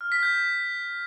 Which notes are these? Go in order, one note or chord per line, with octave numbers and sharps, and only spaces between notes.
F6
B6
G6